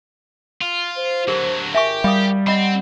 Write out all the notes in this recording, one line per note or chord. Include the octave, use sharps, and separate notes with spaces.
F4
C5
D3 F#3 G4 A#4
G#1 G4 A#4 E5 G#5 C#6
G3 F5 D#6
C4 D#5 F#5 B5